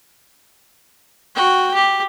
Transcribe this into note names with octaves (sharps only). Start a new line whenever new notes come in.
F#4 G5
G4